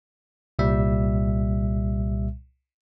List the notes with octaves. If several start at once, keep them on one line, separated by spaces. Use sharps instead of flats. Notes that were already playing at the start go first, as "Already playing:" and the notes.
C2 A#2 G3 E5